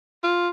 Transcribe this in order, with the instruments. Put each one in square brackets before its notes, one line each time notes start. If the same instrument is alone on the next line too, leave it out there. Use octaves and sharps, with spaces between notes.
[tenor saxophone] F4